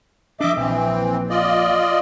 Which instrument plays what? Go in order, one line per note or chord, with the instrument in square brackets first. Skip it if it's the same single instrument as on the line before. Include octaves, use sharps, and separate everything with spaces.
[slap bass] F3 D4 [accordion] D#5 E5 D6
[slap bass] A#1 [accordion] E3 C4
[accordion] F4 D5 D#5